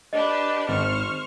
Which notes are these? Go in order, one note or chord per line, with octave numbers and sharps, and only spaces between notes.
D4 G4 B4 D#5
G#1 C5 C#6 F6